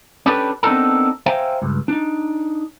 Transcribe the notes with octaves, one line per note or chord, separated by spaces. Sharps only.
C#4 D4 G4 A4 B4
B3 C4 D4 D#4 A4 A#4
C5 E5 F5 G5 G#5 A#5
C#2 G2
D4 D#4